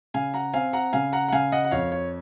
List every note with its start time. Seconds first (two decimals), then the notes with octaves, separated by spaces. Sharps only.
0.14 C#3 F5 G#5
0.34 F#5 A#5
0.53 C4 F5 G#5
0.73 F#5 A#5
0.93 C#3 F5 G#5
1.13 F#5 A#5
1.28 F#5
1.32 C#3 F5 G#5
1.52 D#5 F#5
1.65 F#5
1.71 F2 C#5 F5
1.92 C#5